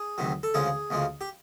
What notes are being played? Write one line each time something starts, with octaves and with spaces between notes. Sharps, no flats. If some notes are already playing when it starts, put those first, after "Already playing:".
Already playing: G#4
D2 C3 D#3 F#3
A4
D2 C#3 F3 G#3 G#4
D2 C#3 F3 G#3
G4